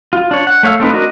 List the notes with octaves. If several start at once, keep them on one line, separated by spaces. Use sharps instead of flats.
F4
D4 C#5
F#5
A3 C#5 F5 E6
A3 C4 D#4 B4
D4 F#4 A#4 D#5